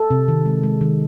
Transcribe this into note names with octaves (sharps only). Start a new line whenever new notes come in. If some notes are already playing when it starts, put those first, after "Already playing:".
Already playing: A4
C3
D#3
G#3
G#3
D#3